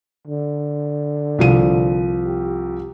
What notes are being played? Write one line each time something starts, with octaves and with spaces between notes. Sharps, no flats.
D3
C2 F3 D#7
G4